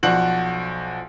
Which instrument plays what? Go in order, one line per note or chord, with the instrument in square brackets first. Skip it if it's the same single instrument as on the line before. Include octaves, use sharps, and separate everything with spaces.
[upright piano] B1 F3 F#4 D5 F#5 F#7